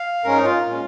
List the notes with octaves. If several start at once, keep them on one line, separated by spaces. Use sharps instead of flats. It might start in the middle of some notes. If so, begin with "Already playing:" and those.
Already playing: F5
G#2 G#3 C#4 A#4
D#4
F4
A#2 G#3 C#4